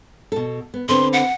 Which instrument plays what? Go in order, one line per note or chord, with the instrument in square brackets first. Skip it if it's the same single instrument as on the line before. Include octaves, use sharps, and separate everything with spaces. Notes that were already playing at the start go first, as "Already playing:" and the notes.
[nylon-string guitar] B2 A4
B3
[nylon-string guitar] D3 C4 B4 [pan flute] C6
[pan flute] F#5